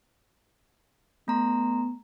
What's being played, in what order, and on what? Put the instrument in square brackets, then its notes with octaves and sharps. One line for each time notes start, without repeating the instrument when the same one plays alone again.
[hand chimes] A3 A#5 C6 [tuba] B3